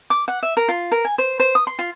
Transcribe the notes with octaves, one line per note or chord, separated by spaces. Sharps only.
D6
F#5
E5
A#4
F4
A#4
G#5
C5
C5
D#6
C6
F4